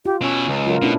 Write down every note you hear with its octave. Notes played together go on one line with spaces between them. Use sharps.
F4 G4
B2 C#4 E4
C#2
F#3 F4 A#4
B2 A3 C#4 D4 E4